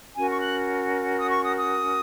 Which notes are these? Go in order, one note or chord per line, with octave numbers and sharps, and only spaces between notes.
C#4 F#4 A#4 G#5
C#6
F#6
D#6
C#6
D#6
D#6